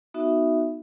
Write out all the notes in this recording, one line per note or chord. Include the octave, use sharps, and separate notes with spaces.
B3 D#4 F#4 E5